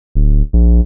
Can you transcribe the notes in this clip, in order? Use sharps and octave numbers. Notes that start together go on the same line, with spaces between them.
D1
A#1